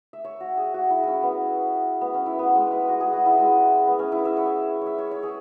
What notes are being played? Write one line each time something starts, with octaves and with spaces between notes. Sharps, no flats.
E5
C#5
F#4
G#4
F#4
E4
C#4 E4
B3
B3
C#4
E4
B3
G#3
B4
F#4
G#4
F#4
E4
G#3
B3
C#4
E4
E5
C#5
C#5 E5
C#5
C#5
G#4